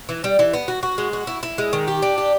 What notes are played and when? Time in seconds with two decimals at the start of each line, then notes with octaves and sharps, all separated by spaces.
0.09 E3
0.24 G3
0.39 E3
0.53 B3
0.68 F#4
0.83 F#4
0.98 G#3
1.13 F#4
1.27 E4
1.43 E4
1.58 G#3
1.73 D#3
1.88 G4
2.02 D4
2.18 G4